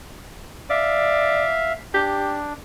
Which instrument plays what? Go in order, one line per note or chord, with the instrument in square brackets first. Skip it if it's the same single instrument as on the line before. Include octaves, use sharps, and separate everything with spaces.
[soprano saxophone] D5 [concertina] E5 F5
[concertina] D4 [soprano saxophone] G4